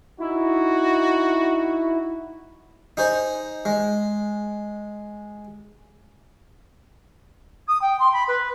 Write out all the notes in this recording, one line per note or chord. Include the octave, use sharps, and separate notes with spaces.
D#4 E4 F#4
D#4 G#4 C5
G#3
D#6
G5
C6
B5
B4